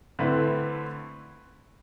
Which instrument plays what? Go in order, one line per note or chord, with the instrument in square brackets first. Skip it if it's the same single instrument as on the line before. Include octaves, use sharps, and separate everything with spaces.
[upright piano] D3 A3 C4 E4 B4